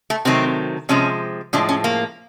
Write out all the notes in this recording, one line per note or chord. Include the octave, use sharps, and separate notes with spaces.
A3
C3 D#3 F#3 A3 C4
C3 F3 G#3 C#4
A2 F3 G#3 D4
C#4
A#3